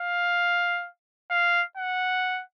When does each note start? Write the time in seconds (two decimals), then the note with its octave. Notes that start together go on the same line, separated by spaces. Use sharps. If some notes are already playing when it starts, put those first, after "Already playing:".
Already playing: F5
1.30 F5
1.77 F#5